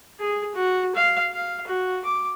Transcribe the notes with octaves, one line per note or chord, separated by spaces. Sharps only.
G#4
F#4
F5
F5
F#4
D6